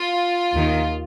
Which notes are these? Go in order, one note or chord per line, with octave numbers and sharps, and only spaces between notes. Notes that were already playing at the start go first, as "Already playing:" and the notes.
Already playing: F4
D#2 D#3